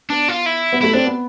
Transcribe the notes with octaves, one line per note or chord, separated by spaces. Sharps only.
B3 D4
F4
E4
B3
A3 E4
C4 D4
B3